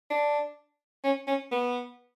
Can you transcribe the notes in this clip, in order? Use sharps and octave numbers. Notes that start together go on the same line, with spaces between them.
D4
C#4
C#4
B3